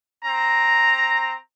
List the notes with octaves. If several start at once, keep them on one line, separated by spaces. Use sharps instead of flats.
C4 A#5